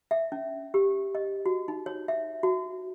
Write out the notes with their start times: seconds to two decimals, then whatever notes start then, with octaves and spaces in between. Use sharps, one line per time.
0.11 E5
0.32 C#4
0.74 G4
1.15 D#5
1.46 F#4
1.68 D#4
1.86 C#5
2.08 E5
2.43 F#4